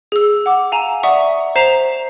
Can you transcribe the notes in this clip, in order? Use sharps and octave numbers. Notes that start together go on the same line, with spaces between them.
G#4 E6
F#5 D6
F5 G#5 A#5 E7
D5 E5 F#5 C#6 D#6
C5 A#5 B6 C7 E7 F7